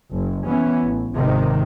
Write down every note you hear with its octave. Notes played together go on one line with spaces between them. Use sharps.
F#1
E3 B3 C#4
A1
G#1 C3 D#3